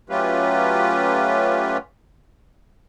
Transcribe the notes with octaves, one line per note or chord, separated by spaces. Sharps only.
F#3 A3 C#4 F4 G4 B4